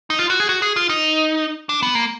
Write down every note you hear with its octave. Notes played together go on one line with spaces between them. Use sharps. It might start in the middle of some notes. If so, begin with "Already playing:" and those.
D#4
F4
F#4
G#4
F#4
G#4
F4
D#4
D4
B3
A#3